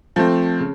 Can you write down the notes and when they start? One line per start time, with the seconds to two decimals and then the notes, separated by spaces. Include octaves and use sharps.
0.16 F3 A3 C4
0.60 C#3